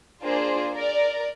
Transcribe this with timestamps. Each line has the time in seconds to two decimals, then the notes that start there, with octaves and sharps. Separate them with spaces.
0.23 A#3 D4 F4 G#4 C5
0.75 A#4 D5